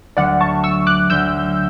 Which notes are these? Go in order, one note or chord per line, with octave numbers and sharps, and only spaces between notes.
D2 D3 F#3 D5 F#5
A5 C#6
C#6 E6
D6 F#6
D2 D3 F#3 E6 G6